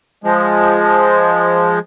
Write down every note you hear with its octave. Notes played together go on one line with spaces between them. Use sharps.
F3 G#3